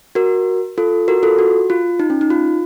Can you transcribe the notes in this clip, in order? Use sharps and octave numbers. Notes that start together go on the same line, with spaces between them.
F#4 A#4
F4 A4
F#4 A#4
F4 A4
F#4
F4
D#4
C#4
D#4
F4